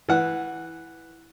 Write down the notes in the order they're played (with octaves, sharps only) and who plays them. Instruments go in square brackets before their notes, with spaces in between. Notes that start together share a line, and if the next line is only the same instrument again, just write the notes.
[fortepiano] E3 F#5